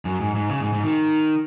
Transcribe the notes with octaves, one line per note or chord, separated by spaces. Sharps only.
F#2
G#2
G#2
C#3
G#2
G#2
D#3